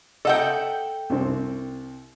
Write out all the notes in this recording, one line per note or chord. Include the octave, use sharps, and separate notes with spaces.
A4 D#5 E5 F#5 G5
C2 C4